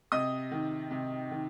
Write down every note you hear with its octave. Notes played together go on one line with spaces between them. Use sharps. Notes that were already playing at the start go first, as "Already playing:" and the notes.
C3 D#5 D#6
D#3
C3
D#3